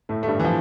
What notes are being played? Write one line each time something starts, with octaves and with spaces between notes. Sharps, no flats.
A2 A3
A3
G2 G3
E3
F3